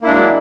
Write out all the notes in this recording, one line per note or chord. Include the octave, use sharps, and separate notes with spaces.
F#3 G#3 A#3 D4 E4